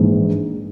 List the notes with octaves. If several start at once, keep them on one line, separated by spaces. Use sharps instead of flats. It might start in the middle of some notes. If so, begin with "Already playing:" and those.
Already playing: A#1 G#2 E3